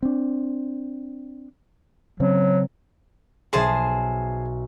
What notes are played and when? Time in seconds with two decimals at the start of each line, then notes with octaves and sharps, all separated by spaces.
0.03 C4 D4
2.20 C#3 F#3 C4 C#4
3.53 B1 G#4 C5 E5 G#5 A5